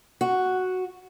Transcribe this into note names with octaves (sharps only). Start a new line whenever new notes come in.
F#4